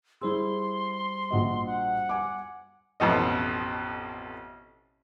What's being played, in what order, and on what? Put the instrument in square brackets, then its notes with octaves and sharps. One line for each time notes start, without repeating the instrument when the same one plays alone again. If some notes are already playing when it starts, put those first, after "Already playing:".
[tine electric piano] G3 C5 E6 [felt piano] E4 G#4 [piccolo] C6
[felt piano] A#1 F#4 D#5
[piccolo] F#5
[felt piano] G#5 D6
[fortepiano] A1 F2 B2 D#5